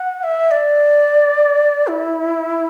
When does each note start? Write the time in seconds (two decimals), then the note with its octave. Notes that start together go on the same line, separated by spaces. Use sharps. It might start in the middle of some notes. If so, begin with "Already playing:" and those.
Already playing: F#5
0.23 E5
0.51 D5
1.87 E4